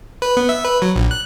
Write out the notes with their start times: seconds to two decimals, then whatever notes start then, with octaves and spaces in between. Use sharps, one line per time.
0.22 B4
0.37 B3
0.49 E5
0.65 B4
0.82 F#3
0.96 A#1
1.11 F#6